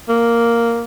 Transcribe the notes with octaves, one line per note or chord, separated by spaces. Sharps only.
A#3